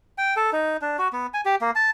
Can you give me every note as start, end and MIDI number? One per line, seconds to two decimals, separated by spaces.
0.18 0.34 79
0.36 0.50 69
0.53 0.77 63
0.81 0.97 62
0.99 1.08 66
1.13 1.27 59
1.34 1.41 80
1.45 1.55 67
1.61 1.71 58
1.75 1.91 81